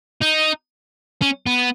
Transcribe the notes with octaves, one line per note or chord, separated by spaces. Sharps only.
D#4
C#4
B3